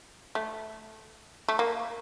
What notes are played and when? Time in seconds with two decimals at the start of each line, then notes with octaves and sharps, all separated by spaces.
0.35 A3
1.48 A3
1.59 A#3